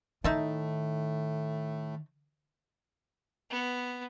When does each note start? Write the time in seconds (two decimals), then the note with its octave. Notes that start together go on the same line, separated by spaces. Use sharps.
0.24 A2 D#3 A3 D#4 E5 A5
3.50 B3